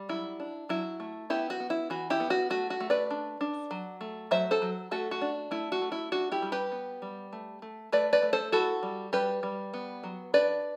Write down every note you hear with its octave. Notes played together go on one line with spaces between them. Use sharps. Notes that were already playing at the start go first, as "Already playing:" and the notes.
Already playing: G3
F#3 E4
D4
F#3 E4
A3
B3 E4 G4
F#4
B3
E4
E3 F#4
E4 G4
B3
F#4
A3 F#4
F#4
A3
B4 D5
D4
D4
F#3
A3
F#3 C5 E5
A4 C5
F#3
A3 F#4 A4
F#4
D4
A3 E4
F#4
A3
E4
D4 F#4
E4 G4
G3
G4 B4
B3
G3
A3
A3
A3 B4 D5
B4 D5
A3
A4 C5
E4 F#4 A4
G3
G3 G4 B4
G3
B3
F#3
D4 B4 D5